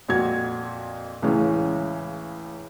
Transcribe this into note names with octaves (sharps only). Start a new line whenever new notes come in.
F2 A#2 F#4 G#6
C#2 A2 C#3 E3 C#4